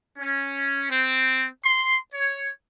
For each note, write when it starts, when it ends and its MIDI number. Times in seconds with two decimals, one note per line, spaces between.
0.18 0.87 61
0.90 1.46 60
1.64 1.97 84
2.14 2.50 73